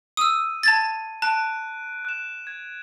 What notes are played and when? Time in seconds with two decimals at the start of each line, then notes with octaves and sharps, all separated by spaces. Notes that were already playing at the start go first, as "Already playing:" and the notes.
0.17 D#6 E6 D#7
0.63 A5 G#6 A6
1.22 A5 F#6 D7 D#7
2.05 F#6 E7
2.47 G#6